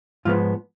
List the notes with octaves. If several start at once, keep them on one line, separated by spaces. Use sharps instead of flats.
G#2 F3 G#3 B3 F4